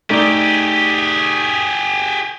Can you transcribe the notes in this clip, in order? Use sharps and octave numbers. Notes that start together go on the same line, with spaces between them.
A3 D#4 G4 G#4 D5